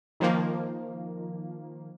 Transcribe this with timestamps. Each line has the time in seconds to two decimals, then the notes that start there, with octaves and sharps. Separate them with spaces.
0.20 D#3 F3 A#3